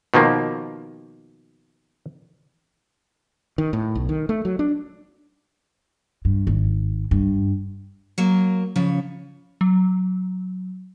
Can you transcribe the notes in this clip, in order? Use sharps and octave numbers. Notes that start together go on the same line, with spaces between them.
B2 D#3 F3 A#3
D#3
A2
B1
D#3
A3
F#3
D4
G2
G#1
G2
F#3 A#3
C#3 F3 C#5
F#3